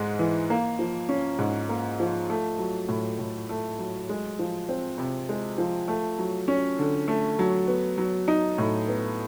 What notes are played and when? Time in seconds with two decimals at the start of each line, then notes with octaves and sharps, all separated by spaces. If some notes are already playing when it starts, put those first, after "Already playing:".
Already playing: G#2 G#3
0.19 E3
0.50 A#3
0.79 F3
1.09 C#4
1.39 G#2
1.69 A#3
2.00 F3
2.30 A3
2.59 F#3
2.88 A2
3.19 A2
3.49 A3
3.79 F#3
4.09 G#3
4.39 F3
4.69 C4
4.98 C3
5.29 G#3
5.58 F3
5.88 A3
6.19 F#3
6.48 C#4
6.79 D3
7.08 A3
7.39 F#3
7.68 B3
7.98 F#3
8.28 D#4
8.58 A2
8.88 B3